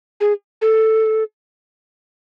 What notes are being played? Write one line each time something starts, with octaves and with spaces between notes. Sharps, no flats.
G#4
A4